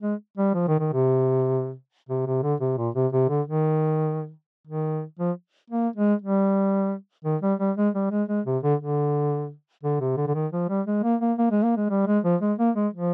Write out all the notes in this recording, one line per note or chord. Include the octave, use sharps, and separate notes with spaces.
G#3
G3
F3
D#3
D#3
C3
C3
C3
D3
C3
A#2
C3
C3
D3
D#3
D#3
F3
A#3
G#3
G3
D#3
G3
G3
G#3
G3
G#3
G#3
C3
D3
D3
D3
C3
D3
D3
D#3
F3
G3
G#3
A#3
A#3
A#3
G#3
A#3
G#3
G3
G#3
F3
G#3
A#3
G#3
F3